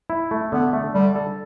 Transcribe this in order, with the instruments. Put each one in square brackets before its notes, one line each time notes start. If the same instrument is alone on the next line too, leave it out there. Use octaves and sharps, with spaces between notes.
[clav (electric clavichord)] E4
A3
[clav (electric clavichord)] D3 [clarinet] B3
[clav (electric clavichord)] A3
[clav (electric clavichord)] D3 [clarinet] G3
[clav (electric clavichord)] A4